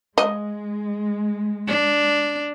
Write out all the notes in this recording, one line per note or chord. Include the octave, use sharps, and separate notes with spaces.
G#3 D#5
D4